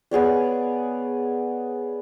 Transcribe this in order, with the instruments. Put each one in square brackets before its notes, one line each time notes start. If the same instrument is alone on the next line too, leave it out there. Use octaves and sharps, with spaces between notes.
[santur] B3 G#4 C#5 D5